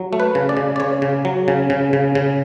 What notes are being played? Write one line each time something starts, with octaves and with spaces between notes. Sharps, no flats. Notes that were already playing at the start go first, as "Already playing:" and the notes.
Already playing: F#3
A3
B4
C#3
D5
C#3
D5
C#3 C#5
C#3
F#3
C#3
C#3
C#3
C#3